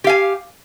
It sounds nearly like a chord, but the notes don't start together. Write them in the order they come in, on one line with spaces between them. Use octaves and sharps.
G4 F5 G#5